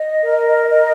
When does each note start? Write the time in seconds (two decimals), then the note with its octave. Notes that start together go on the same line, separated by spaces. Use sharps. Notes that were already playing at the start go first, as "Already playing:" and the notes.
Already playing: D#5
0.23 A#4
0.70 D#5